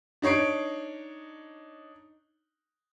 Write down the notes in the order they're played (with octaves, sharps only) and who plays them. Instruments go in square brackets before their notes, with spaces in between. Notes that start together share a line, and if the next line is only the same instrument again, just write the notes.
[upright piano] D4 D#4 C#5 C7 D7